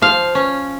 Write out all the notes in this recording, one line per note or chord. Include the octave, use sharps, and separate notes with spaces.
F3 F5
C#4